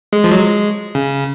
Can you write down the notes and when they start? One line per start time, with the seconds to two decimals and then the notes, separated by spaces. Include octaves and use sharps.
0.13 G#3
0.24 F3
0.31 F#3
0.39 G#3
0.95 C#3